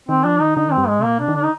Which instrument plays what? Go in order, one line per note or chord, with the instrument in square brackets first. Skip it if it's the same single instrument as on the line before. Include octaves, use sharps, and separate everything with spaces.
[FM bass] D#3 [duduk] C4
[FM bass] F3 [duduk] D4
[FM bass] D#3 [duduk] D#4
[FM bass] D3 [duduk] D#4
[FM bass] D#3 [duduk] C4
[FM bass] G2
[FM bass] G#2 [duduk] G#3
[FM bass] C3
[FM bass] A#2 [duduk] A#3
[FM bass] C3 [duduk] D4
[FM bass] D#3
[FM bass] D3 [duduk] D4
[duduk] D#4